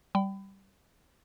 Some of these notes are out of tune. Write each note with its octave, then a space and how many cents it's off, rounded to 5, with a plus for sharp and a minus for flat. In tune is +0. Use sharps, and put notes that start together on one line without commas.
G3 -10 G5 -20 B5 +25